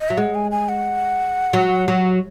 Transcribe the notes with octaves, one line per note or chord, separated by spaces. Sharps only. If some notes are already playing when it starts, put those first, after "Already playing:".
D#5
F#3 E5
G#3 F#5
G#5
G#5
F#5
F#3
F#3